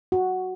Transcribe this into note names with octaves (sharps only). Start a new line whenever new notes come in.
F#4